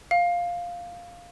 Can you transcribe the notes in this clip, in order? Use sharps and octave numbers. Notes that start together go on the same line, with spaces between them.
F5